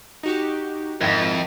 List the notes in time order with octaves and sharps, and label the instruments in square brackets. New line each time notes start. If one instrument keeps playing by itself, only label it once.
[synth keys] D#4 F#4 G4
[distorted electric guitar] F2 [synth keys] G#2 [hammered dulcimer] D#3 [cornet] E4